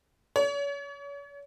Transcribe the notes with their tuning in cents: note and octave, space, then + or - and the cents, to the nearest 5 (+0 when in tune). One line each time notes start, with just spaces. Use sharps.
C#5 +40